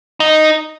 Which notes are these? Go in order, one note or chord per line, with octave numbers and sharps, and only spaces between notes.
D#4